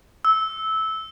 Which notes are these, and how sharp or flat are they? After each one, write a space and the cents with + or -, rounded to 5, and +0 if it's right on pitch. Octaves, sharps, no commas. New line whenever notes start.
E6 -15